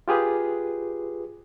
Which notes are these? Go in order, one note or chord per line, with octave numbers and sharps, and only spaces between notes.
F4 G4 G#4 B4